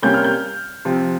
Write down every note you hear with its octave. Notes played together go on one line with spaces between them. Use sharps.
C3 G3 A#3 C#4 G6
F6
G6
C3 F3 C4